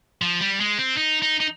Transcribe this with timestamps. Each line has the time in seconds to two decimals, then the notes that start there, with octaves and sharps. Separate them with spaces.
0.22 F3
0.40 G3
0.60 G#3
0.78 C4
0.97 D#4
1.22 D#4
1.40 D#4